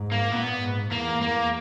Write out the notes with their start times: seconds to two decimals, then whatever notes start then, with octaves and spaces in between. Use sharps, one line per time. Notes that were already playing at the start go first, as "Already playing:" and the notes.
Already playing: G#2
0.12 A#3
0.31 A#2 B3
0.61 G#2
0.91 E2 A#3
1.21 E2 A#3